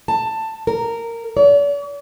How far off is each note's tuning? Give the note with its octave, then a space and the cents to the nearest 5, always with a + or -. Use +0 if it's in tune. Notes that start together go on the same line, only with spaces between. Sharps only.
A5 +15
A#4 -15
D5 -45